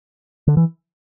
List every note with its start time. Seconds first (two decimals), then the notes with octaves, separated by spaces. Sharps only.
0.48 D3
0.57 E3